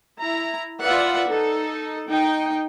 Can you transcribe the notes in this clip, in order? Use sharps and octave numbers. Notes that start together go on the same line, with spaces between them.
E4 A#5
F4 B4 D5 E5 F#5
D#4 A4
D#4 G5